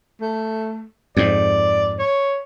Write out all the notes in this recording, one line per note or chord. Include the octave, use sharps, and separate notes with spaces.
A3
F2 G#2 D5
C#5